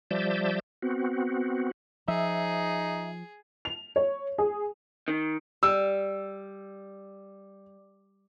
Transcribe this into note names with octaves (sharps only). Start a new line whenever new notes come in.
F3 G3 D5 E5 A5 G6
B3 C4 F#4
F3 D#4 G#4 E5
F7
C#5
G#4
D#3
G3 E6